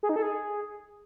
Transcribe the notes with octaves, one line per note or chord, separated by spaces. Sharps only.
G#4
D#4
A4
G#4